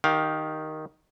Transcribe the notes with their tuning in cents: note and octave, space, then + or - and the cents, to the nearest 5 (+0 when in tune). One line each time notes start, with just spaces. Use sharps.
D#3 +0 G4 -10 F5 +20